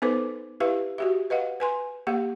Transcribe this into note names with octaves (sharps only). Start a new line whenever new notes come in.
B3 D#4 A4 B4 C5 D6
E4 G4 B4 E5 F5
F#4 G4 E5
B4 D#5 F5 F#5
B4 G#5 C6
A#3 G4 F5 F#5